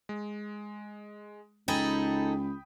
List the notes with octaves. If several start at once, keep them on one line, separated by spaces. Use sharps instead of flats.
G#3
C#2 D#4 G#4 A4 G5 B5 D#6